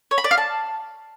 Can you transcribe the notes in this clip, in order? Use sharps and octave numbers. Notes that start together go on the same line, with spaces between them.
C#5
B5
D5
F5
A5